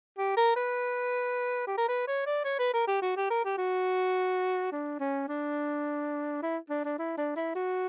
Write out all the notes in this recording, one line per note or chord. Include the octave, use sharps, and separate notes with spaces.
G4
A#4
B4
G4
A#4
B4
C#5
D5
C#5
B4
A#4
G4
F#4
G4
A#4
G4
F#4
D4
C#4
D4
E4
D4
D4
E4
D4
E4
F#4